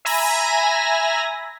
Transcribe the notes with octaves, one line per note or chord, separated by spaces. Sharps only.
E5 G#5 A#5 B5 A#6